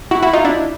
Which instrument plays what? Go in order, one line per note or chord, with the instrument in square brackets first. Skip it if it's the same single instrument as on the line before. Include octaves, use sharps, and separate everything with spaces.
[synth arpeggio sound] E4 F#4
E4 F#4
D#4 F4
D4 E4